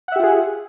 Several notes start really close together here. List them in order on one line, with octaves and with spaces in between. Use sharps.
F#5 E5 G4 F4 G#4